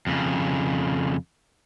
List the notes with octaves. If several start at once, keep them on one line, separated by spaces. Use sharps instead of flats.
F2 C#3